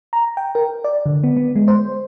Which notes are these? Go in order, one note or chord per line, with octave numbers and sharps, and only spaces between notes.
A#5
G5
A#4
D5
D3
B3
B3
G#3
C5